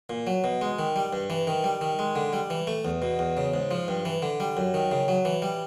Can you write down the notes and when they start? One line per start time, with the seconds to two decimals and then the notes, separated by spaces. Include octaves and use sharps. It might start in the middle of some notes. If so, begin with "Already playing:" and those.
0.10 A#2
0.27 F#3
0.44 B2
0.61 G#3
0.79 D#3
0.96 G3
1.13 G2
1.30 E3
1.47 D#3
1.64 G3
1.81 D#3
1.99 G#3
2.16 D3
2.33 G3
2.50 E3
2.67 A3
2.85 E2
3.02 B2
3.19 E2
3.37 C#3
3.54 G#2
3.71 F3
3.88 G2
4.05 E3
4.22 D3
4.40 G3
4.57 F#2
4.74 D#3
4.92 C#3
5.08 F#3
5.25 E3
5.42 G3